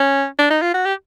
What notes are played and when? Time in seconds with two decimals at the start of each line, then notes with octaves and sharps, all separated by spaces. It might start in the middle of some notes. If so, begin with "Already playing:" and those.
Already playing: C#4
0.39 D4
0.50 D#4
0.62 F4
0.74 F#4
0.85 G4